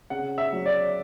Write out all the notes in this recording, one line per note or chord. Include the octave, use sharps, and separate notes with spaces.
C#3 F#5
E5
F#3
D5